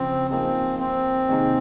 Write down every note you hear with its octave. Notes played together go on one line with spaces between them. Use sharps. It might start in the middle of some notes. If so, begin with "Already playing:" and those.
Already playing: C#3 F3 C4
F3 A#3 C4 D#4 G#4
C4
C3 D#3 A#3 D#4 G#4